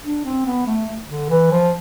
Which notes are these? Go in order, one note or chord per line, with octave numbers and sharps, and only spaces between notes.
D4
C4
B3
A3
D3
E3
F3